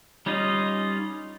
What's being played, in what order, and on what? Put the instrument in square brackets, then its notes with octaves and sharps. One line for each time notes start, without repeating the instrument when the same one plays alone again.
[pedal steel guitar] G3 C#4 D#4 F4 D#5